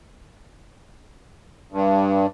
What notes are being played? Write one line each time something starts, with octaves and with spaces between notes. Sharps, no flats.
G2